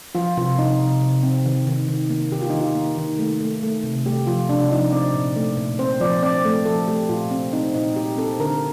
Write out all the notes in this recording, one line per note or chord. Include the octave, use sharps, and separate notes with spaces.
F3 F4
C3 F4
C3 D#4
C3
C3
C4
D#3
D#3
D#3
A#3
D#3 G4
F4
D#3 D#4
F4
A#3
D#3
A3
A3
A3
C3
A3 G4
F3 F4
C3 D4
F3 D#4
C4 D5
A#2
A3
A#2
C4 C5
F3 D5
C4 D5
A3
F3 A4
A3 G4
A#2 F4
C4
C4 D#4
A#2 D#4
A#2 G4
C4 A4
D3 A#4